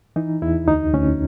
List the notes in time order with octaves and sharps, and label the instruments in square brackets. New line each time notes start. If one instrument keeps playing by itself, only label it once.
[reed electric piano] E3 D#4
E2 E4
D2 D#4
D2 C#4